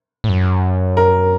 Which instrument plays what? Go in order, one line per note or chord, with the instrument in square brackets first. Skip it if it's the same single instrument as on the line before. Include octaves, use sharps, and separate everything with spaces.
[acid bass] A2
F#2
[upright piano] A#4